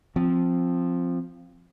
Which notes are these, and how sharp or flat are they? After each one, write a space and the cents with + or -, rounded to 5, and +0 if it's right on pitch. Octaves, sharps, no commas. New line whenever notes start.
F3 +0 C4 +0